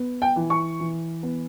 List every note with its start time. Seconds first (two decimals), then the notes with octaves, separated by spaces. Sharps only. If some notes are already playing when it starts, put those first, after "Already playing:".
Already playing: B3
0.22 G5
0.36 E3
0.50 C#6
0.80 E3
1.23 B3